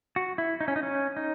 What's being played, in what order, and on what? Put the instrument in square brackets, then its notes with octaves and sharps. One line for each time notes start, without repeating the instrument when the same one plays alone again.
[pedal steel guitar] F#4
E4
D#4
C#4
D#4
C#4
D#4